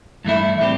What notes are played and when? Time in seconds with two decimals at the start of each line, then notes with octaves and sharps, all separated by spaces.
0.25 G2 E3 A3 E4
0.61 A2 G3 C4 G4